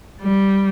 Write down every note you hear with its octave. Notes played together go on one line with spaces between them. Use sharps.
G3